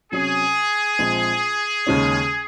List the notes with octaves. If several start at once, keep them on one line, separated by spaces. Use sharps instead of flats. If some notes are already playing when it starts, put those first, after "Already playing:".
C3 F#3 C#4 G#4
A#1 A#2 F3 G#3 C4
D#2 C#3 G#3 C#4